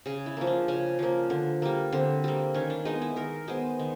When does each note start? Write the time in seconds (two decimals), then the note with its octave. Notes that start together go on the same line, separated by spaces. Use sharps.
0.06 C#3 G#4
0.26 E4
0.37 F3 A#3
0.47 D4
0.68 C#3 C#4
0.99 F3 A#3
1.30 D3
1.62 G3 A#3
1.92 D3 C4
2.24 G3 A#3
2.54 D#3 C#4
2.70 D4
2.85 G#3 B3 D#4
3.02 E4
3.16 D#3 A#4
3.48 G#3 B3 C5
3.79 D#3